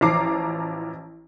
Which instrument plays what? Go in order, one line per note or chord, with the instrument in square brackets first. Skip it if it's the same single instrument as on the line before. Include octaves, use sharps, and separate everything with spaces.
[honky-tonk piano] A1 E3 F3 A#5 D6 C7